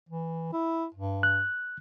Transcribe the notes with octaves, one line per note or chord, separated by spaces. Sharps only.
E3
E4
G2
F#6